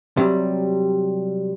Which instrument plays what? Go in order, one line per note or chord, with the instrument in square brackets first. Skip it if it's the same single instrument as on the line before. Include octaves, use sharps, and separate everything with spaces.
[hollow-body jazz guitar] C3 F#3 G3